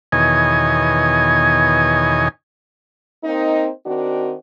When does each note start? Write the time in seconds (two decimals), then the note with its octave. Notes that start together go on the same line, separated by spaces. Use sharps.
0.12 E2 B2 D#3 C#5 D#5 G#5
3.24 A#3 C4 D#4
3.86 D#3 C4 D4 F#4